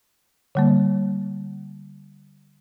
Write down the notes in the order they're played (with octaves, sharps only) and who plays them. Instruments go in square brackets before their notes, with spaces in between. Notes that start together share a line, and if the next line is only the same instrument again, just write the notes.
[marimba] D3 G3 A#3